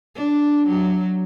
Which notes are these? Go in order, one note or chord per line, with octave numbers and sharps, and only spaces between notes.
D4
F#3